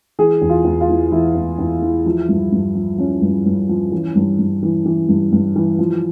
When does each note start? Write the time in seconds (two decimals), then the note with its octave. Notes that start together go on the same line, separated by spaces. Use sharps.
0.19 E3 G#4
0.42 E2
0.50 F4
0.65 E2
0.81 F4
0.89 E3
1.12 E3 E4
1.35 E2
1.59 E2
1.82 E3
2.06 F3
2.29 G2
2.52 G2
2.75 F3
2.98 F3 C#4
3.22 G2
3.46 G2
3.69 F3
3.92 E3
4.15 G2
4.39 G2
4.63 E3
4.86 E3
5.09 G2
5.32 G2
5.56 E3
5.79 F3